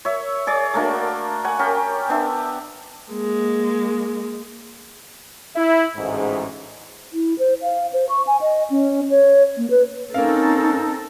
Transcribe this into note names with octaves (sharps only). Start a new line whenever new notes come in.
C#5 E5
G#4 C#5 D5
A3 A#3 D4 F#4
F#5 G#5 C#6
C#4 G4 A#4 A5
B3 D4 E5
G#3 A#3
E4
A1 D2 G#2
E4
C5
F5
C5
C#6
G#5
D#5
C#4
C#5
A#3
B4
A#3 C4 C#4 D#4 A4 A#4 F5